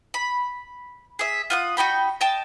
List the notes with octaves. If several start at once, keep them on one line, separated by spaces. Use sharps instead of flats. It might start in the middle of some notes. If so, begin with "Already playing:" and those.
B5
G#4 E5
F4 F#5 D#6
D#4 F#4 G5 B5
D#5 G5 A5